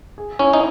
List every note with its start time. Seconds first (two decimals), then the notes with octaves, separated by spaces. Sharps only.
0.18 G#4
0.39 C#4 E4
0.53 D#4